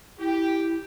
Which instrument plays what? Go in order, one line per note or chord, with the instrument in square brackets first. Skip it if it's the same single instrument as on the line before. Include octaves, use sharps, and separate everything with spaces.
[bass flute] E4 [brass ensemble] G4